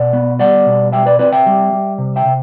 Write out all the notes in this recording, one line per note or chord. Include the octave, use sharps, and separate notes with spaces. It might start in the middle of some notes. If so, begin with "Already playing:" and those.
Already playing: B2 D5 F#5
B3
G3 D5 F#5
B2
G3 E5 G5
B4 D5
C4 B4 D5
E5 G5
G3
G3
C3
E5 G5
C3